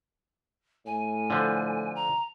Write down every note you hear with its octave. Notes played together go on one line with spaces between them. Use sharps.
A2 G#5
D3 F3
A#5